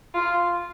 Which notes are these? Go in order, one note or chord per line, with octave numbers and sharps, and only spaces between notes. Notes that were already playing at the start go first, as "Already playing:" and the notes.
F4